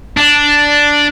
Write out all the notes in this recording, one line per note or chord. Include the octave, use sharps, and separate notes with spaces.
D4